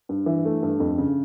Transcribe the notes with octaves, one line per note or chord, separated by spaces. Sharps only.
G2
E3
A3
G2
F2
C#3